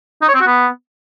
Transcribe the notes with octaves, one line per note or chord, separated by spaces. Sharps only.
D#4
C#5
C4
F#4
B3